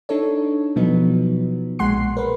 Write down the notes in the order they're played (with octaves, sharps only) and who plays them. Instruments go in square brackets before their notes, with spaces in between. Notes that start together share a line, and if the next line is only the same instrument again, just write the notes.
[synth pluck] D4 D#4 A4 C#5
B2 F3 F#3 B3 D#4
B1 A#2 G#3 F#5 C6 C7
A#4 B4